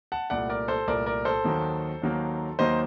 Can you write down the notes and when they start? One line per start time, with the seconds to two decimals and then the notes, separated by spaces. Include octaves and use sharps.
0.12 F#5 A5
0.30 C2 A#2 A3 D5 F#5
0.49 A#4 D5
0.68 A4 C5
0.87 C2 A#2 A3 A#4 D5
1.06 A#4 D5
1.25 A4 C5
1.44 D#2 D#3 F#3 A#3
2.02 D#2 D#3 F#3 A#3
2.59 D#2 D#3 F#3 A#3 C5 D#5